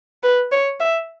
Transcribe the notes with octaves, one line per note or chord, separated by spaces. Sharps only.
B4
C#5
E5